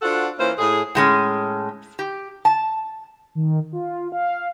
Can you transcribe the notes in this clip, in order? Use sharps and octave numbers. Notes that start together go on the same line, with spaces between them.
D4 F4 F#4 A4 C5 F#5
E3 A#3 C#4 E4 F4 C5
A2 G#4
A2 G#3 C#4
G4
A5
D#3
F4
F5